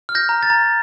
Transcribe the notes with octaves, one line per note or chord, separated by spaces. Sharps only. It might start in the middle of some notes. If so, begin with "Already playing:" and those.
F6
G6 A#6
A#5
A6
A#5